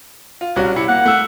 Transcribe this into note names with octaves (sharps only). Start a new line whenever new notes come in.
F4
C2 C#4 F#4
C3 E4 C#7
A#3 F#5
A3 E6